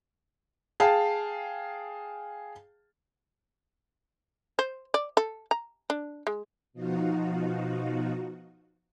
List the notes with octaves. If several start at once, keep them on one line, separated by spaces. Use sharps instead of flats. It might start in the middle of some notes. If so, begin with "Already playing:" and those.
G#4 F5 G5 A5
C5
D5
A4
A#5
D4
G#3
B2 F3 D#4 F4 F#4